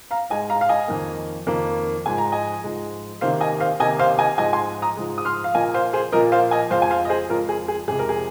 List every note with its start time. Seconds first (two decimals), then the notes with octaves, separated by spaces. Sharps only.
0.11 F5 A#5
0.30 G#2 G#3 D#5 G#5
0.50 F5 A#5
0.61 F5
0.69 D#5 G#5
0.88 F2 D#3 A#3
1.47 F2 D#3 A#3
2.06 G#2 F3 G#3 G#5
2.18 A#5
2.32 D#5 G#5
2.64 G#2 F3 G#3
3.21 C3 D#3 A#3 C5 F5
3.40 D#5 G#5
3.60 C5 F5
3.80 C3 D#3 A#3 D#5 G#5
3.99 C5 F5
4.19 D#5 G#5
4.38 G#2 F3 G#3 D#5 G#5
4.53 G#5 C6
4.82 A#5 D#6
4.97 G#2 F3 G#3
5.18 D#6
5.25 C6 F6
5.44 F5
5.54 A#2 F3 A#3 D#5 G#5
5.74 C5 F5
5.93 G#4 C5
6.12 A#2 F3 A#3 A#4 D#5
6.32 C5 F5
6.51 D#5 G#5
6.71 F2 F3 G#3 C5 F5
6.82 G#5
6.90 C5 F5
7.05 D#5
7.09 G#4 C5
7.29 F2 F3 G#3 F4 A#4
7.49 G#4
7.68 G#4
7.88 F2 C3 G#3 G#4
7.99 A#4
8.09 G#4